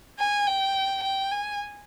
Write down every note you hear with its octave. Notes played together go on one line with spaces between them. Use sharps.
G#5
G5
G5
G#5